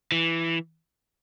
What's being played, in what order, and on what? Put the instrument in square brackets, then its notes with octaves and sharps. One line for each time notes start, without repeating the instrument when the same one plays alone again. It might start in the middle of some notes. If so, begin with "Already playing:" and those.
[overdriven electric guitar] E3